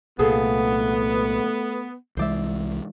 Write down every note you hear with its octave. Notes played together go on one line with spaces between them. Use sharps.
C2 A#2 A3 B3 G#4 A4 F5
C2 E3 G#3 C5 D5 E5